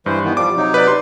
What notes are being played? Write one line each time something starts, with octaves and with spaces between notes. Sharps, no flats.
G2 E3 C5
D#3 E3 B3
F3 G3 D6
C3 F#3 D#4
B4 D5
C6